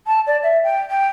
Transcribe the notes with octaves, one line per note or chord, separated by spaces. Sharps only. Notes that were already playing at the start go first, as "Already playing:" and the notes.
A5
D5
E5
G5
G5